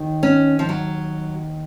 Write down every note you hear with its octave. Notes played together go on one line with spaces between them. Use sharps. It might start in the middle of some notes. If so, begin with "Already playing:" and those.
Already playing: D#2 D#3
C#4
F3
F#3